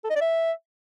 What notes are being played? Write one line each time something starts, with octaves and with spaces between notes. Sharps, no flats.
A4
D#5
D5
E5